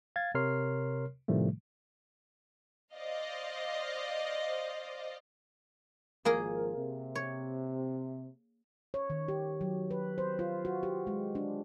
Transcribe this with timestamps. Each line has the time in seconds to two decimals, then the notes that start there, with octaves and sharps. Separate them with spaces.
0.16 F5 G#6 A6
0.35 C3 A#4 C#5 C6 F6 C7
1.28 A2 C3 D#3 F3 G3 A3
2.95 C5 D5 D#5 F5
6.25 G#1 F3 A#3 G#4 A#4
6.75 C3
7.15 C#5
8.94 C#5
9.10 D#3
9.28 G4
9.61 F#3
9.91 B4
10.18 C5
10.39 F4
10.65 F#4
10.83 G4
11.07 G#3
11.35 D4